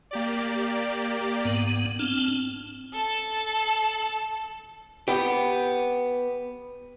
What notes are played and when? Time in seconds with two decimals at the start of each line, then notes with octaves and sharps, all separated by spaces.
0.11 A#3 G4 D5
1.45 G#2 B3
1.99 C4 D4 F6
2.93 A4 A5
5.08 B3 G4